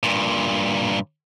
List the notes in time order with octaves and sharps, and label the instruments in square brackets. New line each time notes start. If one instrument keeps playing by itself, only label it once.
[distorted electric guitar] G2 A#2